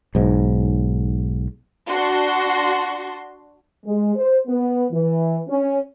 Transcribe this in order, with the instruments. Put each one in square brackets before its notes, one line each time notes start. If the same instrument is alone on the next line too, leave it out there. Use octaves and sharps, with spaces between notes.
[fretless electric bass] B1 G#2
[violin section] D4 F#4 C6
[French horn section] G#3
C5
B3
E3
C#4